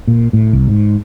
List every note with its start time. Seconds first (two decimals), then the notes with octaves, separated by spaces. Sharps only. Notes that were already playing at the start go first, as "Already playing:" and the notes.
0.08 A#2
0.33 A2
0.53 C2
0.68 G#2